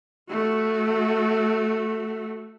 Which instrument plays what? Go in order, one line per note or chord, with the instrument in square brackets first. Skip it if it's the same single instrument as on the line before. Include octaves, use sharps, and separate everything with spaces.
[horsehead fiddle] A3 F#4